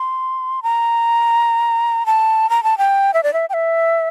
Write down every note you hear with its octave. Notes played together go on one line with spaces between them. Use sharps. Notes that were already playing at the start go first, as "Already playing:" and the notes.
Already playing: C6
A#5
A5
A#5
A5
G5
E5
D5
E5
G5
E5